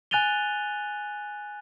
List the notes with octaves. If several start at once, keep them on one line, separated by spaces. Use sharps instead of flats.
G#5 F#6 A6 D#7 F7 G7